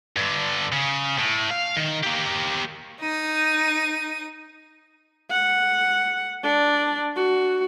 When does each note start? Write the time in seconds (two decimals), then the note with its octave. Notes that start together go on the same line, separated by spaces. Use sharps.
0.17 G2 D3
0.72 C#3
1.19 A2
1.51 F5
1.77 D#3
2.03 A#3 G4
3.01 D#4 D#7
5.31 F#5
6.43 D4
7.16 F#4